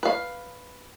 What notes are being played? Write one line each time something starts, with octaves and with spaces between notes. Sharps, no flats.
B4 F5